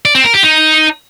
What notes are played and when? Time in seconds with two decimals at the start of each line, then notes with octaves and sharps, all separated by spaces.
0.05 D5
0.15 C4
0.24 A#4
0.34 G4
0.43 D#4